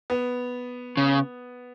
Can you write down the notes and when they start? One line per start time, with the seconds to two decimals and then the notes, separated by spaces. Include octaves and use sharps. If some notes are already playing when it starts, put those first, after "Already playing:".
0.10 B3
0.97 C#3